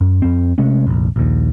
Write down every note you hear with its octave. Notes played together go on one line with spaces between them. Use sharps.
F#2
F2 C4
C3 G#3 A3 C#4
F1 A#1
A#1 D#2